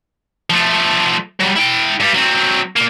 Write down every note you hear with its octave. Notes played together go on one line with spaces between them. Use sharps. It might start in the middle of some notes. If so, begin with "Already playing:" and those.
F3 A3
F#3 G3
E4 G5
G2 G3
F#3 C4
A#2 A#3